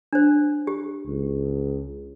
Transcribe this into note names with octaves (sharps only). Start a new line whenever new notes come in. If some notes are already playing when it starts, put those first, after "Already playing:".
D4 C5
G4
C#2